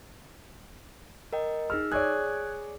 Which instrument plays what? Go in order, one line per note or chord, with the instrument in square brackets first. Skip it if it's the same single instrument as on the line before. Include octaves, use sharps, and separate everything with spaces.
[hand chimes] A#4 D#5 G5
[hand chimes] D#4 G#4 E6 [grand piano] F6
[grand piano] G#4 C#5 D5 [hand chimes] F#6 G#6